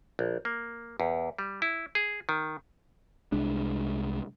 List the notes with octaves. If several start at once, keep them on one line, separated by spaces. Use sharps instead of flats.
A#1
A#3
E2
G3
E4
G#4
D#3
C2 G#3 D4